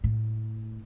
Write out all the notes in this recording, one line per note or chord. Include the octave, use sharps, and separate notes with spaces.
A2